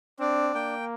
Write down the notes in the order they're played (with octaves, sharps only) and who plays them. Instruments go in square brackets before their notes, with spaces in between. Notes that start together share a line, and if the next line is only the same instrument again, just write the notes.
[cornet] C4 [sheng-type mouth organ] D4
[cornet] A#3 [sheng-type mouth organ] G5